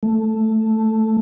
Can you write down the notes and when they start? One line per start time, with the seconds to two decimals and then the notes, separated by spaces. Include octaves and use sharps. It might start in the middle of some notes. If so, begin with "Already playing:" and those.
0.03 A3